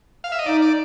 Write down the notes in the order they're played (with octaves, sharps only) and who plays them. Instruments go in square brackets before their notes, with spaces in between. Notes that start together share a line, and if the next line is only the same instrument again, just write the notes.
[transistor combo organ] F5
E5
D#5
[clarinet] D#4 [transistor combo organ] D5
[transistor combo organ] D5